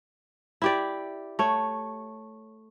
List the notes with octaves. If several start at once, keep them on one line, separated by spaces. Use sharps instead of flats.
E4 G4 D5
A3 C#5